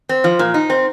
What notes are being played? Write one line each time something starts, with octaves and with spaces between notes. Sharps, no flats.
C4
F3
A#2
D#4
C4